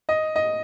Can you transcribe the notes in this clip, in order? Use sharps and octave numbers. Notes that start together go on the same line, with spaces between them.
D#5
D#5